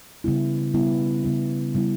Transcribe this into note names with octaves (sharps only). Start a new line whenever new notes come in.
C#3 G3 B3 E4
C#3 G3 B3 E4
C#3 G3 B3 E4
C#3 G3 B3 E4